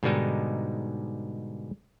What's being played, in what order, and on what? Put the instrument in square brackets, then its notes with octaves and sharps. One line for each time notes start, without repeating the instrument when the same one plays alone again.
[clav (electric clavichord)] G#2 B2 D3 G3 G#3 D#4